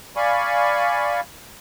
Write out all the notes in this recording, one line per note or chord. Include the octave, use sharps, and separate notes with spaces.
D5 F5 G#5 B5 C#6